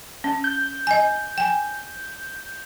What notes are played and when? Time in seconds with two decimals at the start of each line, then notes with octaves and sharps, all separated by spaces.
0.24 C#4
0.44 G6
0.87 D#5 G#5
1.38 G5 G#5